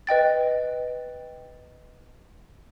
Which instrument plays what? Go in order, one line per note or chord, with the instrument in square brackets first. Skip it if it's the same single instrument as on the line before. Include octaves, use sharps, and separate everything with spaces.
[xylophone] B4 D#5 G5 A6